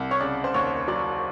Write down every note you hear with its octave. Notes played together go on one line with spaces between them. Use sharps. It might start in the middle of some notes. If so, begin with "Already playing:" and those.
Already playing: C2
C#5
C#3 D5
C5
D#2 C#5
F#3 D5